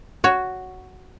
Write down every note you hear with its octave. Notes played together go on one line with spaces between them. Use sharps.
F#4 C#5